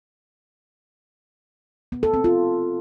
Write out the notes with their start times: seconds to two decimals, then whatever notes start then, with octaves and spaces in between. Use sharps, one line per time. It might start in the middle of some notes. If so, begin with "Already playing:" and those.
1.92 B3
2.03 A4
2.14 C4
2.24 F4